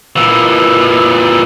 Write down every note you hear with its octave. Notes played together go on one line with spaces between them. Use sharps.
A#2 E3